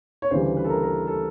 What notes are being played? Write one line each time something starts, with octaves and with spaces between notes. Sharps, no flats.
C#5
D2 C#3 E3 G3 C5
B4
A4
A#4
A#4
A4